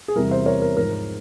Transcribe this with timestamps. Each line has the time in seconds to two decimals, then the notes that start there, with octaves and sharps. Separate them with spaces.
0.08 G#4
0.16 E2 C3 E3 G3 A#4
0.31 C5 E5
0.46 A#4 C#5
0.62 A#4
0.76 G#2 F3 G#3 A#4